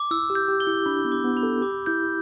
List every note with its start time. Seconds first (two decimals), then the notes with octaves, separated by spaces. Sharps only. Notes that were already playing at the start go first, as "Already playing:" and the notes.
Already playing: D6
0.11 E4 E6
0.30 G4
0.35 G6
0.48 G4
0.60 G7
0.67 E4
0.86 D4 B5
1.05 B3
1.12 D6
1.24 B3
1.37 B5
1.43 A4
1.62 G4 D6
1.86 E4 G6